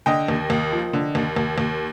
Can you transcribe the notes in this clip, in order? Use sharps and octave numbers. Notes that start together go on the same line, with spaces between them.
D3 D#5 G5
D#2
D#2
F3
D3
D#2
D#2
D#2